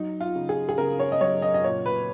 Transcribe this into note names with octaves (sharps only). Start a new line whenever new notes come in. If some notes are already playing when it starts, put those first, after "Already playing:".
Already playing: F#3 D#4
F4
C#3
G#4
G#4
C#3 A#4
C#5
D#5
F#3 C#5
D#5
D#5
A#2 C#5
B4